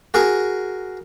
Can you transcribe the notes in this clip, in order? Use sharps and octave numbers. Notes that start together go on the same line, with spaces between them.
F#4 G#4 A#4